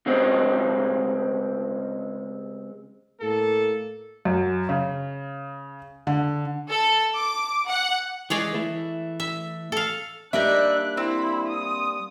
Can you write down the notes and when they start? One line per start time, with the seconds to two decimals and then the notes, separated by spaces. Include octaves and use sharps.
0.06 C#3 G3 G#3 C4 C#4
3.22 A2 A#3 A4
4.25 F#2
4.69 C#3
6.07 D3
6.68 A4
7.15 D6
7.68 F#5
8.30 E3 G#3 G#4 C#5 D5
8.54 E3 A3 E4
9.20 E5
9.72 A4 F5
10.33 G3 A#3 D4 D#4 D5 E5 F#6
10.97 C4 E4 B5
11.47 D#6